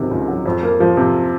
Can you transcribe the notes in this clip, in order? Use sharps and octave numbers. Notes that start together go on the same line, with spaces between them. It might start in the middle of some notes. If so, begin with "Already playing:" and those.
Already playing: C#2 C3 D#3 F#3
C#2
F#3
F2
A#3
F3
C3